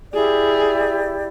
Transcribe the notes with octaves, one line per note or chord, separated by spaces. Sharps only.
E4 G4 G#4 D5